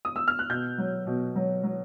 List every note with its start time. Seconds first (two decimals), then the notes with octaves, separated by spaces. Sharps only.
0.05 D#6
0.16 E6
0.28 F6
0.39 F#6
0.50 B2 G6
0.78 F#3
1.07 B2
1.36 F#3
1.63 F#3